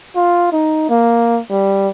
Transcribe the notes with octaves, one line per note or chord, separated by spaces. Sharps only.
F4
D#4
A#3
G3